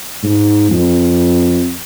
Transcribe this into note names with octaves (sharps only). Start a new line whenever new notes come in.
G#2
F2